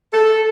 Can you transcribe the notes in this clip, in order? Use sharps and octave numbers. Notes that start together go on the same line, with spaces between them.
A4